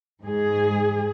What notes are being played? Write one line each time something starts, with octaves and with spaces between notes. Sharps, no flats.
G#2 G#4